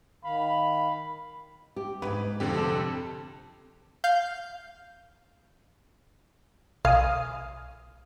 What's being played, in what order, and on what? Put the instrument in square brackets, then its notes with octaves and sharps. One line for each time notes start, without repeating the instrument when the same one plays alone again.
[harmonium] D#3 F5 [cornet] B5
[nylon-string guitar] G4
[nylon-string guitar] F2 G#2 [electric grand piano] B4
[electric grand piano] F2 D3 G4 [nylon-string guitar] C4
[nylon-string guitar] C3 A4
[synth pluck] F5 G6
[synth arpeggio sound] B1 G#5 D#6 [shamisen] F5